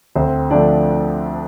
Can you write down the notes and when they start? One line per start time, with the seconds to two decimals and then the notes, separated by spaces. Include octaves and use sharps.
0.15 D2 C4 C5
0.50 D3 F3 A3 D4 D5